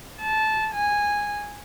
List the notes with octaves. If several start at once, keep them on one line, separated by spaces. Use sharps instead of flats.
A5
G#5